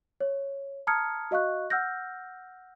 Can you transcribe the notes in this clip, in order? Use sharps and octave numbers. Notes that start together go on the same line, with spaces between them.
C#5
A5 A#5 D#6 F6 G#6 C#7
F#4 D#5 F5 C#6 F#6
F#5 E6 F6 G6 A#6